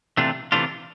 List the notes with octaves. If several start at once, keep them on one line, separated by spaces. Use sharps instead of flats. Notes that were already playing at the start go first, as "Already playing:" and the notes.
C3 E3 A3 D4 F4
C3 E3 A3 D4 F4